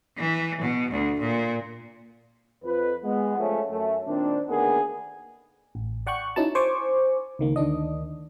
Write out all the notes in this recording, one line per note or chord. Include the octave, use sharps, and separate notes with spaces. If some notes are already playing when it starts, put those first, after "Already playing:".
E3
B2
D2
A#2
F2 B4
G#3 B3
F3 G#3 A3 C#4
F#2 A3 C#4
A#2 D#3 C4 D4
D2 D#3 A#3 B3 D4 G#4
A1
D5 F#5 G5 C#6 F#6
C#4 D#4 E4 F#4 A5
C5 G#5 C#6 D6
C#2 D#3 A#3
D2 D#3 D4 D#5